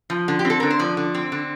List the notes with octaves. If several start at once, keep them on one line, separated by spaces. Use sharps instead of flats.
F3
D3
G4
C4
A4
D3 A#4
C5
F3 D5
D3
C4
D3